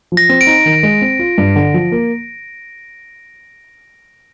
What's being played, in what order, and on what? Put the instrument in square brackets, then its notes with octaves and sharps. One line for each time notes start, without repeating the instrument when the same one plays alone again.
[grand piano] F3
[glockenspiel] A#6
[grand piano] C4
[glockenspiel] D7
[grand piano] D#4
D#3
G#3
C4
F4
G2
D3
F3
A#3